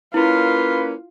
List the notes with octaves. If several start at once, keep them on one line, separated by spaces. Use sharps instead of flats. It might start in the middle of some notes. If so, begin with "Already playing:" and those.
A#3 C#4 E4 F4 B4